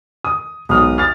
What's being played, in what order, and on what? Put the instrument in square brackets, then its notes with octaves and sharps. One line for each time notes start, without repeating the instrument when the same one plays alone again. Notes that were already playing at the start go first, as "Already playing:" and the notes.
[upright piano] D#6
[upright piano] B1 G#2 F6 [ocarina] D#6
[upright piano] F6 A6